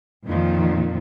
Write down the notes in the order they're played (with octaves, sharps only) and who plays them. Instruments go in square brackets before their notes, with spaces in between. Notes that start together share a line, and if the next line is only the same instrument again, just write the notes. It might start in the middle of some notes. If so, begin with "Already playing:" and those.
[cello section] F2 A#2 D#3 F3